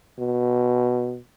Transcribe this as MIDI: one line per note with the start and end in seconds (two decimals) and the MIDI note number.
0.19 1.18 47